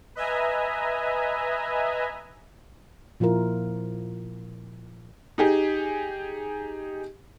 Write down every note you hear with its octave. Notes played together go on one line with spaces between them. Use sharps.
B4 D#5 E5 G#5 A#5
A#2 F3 E4 F4 A#4
D#4 G4 G#4